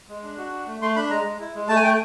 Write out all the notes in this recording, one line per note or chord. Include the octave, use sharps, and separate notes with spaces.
G#3
D4
F#4
D4
A3
A3 C6
D4 B5
G#3 A#5
G#3
E4
G#3
A3 A5
G#5
A3 G5